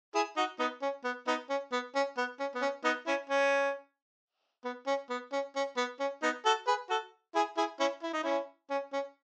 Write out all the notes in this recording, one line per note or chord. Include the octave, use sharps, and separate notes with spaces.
E4 G#4
D#4 F#4
B3 D#4
C#4
B3
B3 D#4
C#4
B3
C#4
B3
C#4
B3
C#4
B3 D#4
C#4 E4
C#4
B3
C#4
B3
C#4
C#4
B3
C#4
B3 D#4
F#4 A4
G#4 B4
F#4 A4
E4 G#4
E4 G#4
C#4 E4
E4
D#4
C#4 E4
C#4
C#4